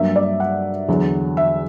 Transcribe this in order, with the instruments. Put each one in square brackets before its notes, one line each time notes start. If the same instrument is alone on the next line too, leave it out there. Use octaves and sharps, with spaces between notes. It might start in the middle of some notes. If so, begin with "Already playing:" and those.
Already playing: [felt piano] G2 F#3 A#3 E5
D5
F#5
E2 D3 F#3
E5